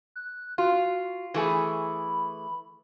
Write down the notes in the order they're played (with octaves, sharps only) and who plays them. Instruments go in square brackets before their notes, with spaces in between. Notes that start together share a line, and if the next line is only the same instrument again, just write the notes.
[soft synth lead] F#6
[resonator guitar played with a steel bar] F4 [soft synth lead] F#4
[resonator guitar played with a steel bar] E3 A3 G#4 [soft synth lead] B5